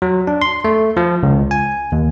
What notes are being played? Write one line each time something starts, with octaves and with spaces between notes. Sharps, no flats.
F#3
D4
C6
A3
F3
C#2
G#5
D#2